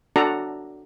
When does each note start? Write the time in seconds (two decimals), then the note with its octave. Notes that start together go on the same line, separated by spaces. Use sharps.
0.16 D4 F#4 A4 D5 A#5